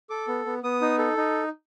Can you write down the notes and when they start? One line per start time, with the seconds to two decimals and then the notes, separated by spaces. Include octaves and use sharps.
0.10 A4 D6
0.28 B3
0.46 B3
0.63 B3 D#6
0.82 D#4
0.99 A4
1.17 D#4